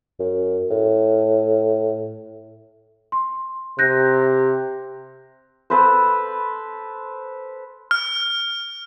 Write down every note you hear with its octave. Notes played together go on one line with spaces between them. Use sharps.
F#2
A2
C6
C3 F#6 G6 A#6
A4 B4 C5
F6